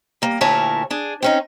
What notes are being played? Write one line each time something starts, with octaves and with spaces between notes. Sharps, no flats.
G3 A#3
D2 A#2 E4 A#4 C#5 A5
D4 G#4
C4 C#4 D#4